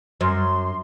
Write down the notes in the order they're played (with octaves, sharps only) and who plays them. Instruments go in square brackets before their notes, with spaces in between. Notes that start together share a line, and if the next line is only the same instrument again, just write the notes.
[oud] F#2 [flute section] C6